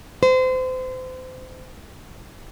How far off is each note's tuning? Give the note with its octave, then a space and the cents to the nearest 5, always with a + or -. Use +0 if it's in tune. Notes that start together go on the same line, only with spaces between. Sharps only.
C5 -30